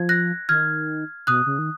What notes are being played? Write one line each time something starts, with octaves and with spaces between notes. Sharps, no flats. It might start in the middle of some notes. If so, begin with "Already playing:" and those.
Already playing: F3 G#6
F#6 A#6
D#3 F6 G#6
B2 D#6 F#6
C#3
D#3